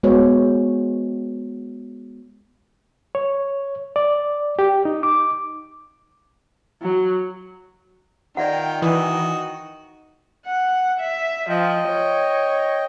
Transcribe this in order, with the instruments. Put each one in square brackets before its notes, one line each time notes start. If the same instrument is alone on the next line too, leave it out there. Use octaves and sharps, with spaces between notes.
[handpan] G#3 B3 F#4 C5 C#5
[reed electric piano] C#5
D5
G4
D#4
D6
[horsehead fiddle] F#3
[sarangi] D#3 [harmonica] F4 G5 [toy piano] D5 E5 F#5
[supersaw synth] E3 [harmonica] F#4 D#5
[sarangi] F#5
E5
[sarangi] F3 [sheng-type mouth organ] D#5 G5
[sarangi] C#5